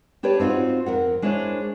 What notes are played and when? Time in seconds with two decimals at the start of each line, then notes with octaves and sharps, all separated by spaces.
0.23 D4 G4 B4 C#5 D5
0.40 C4 D#4 F4 F#4
0.86 F2 A#4 F#5
1.22 G#3 D4 E4 C5 C#5